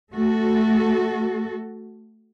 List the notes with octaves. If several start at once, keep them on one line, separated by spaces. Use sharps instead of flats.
A3 F#4 A4